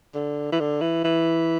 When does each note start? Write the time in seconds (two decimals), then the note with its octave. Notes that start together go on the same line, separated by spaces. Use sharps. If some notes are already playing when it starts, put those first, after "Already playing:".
0.15 D3
0.52 E3
0.60 D3
0.81 E3
1.04 E3